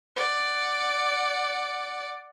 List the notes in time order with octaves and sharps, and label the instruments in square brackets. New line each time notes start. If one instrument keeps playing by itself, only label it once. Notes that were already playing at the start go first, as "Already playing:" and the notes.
[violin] D5 F#5